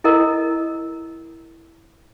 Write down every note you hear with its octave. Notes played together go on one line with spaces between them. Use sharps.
E4 A4 A#4 D#5